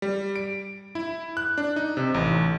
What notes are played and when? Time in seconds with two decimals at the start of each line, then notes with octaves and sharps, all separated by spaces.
0.02 G3
0.36 D7
0.95 E4
1.37 F#6
1.58 D4
1.76 D#4
1.97 C3
2.14 A1